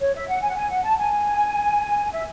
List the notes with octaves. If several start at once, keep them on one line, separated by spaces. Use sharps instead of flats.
C#5
E5
F#5
G#5
F#5
G#5
F#5
A5
G#5
E5